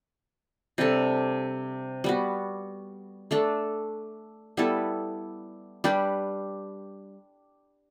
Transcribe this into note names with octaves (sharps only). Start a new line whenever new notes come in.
C3 G3 D4 A4
G3 B3 F#4
A3 D4 A4
G3 B3 E4 A4
G3 D4 G4 B4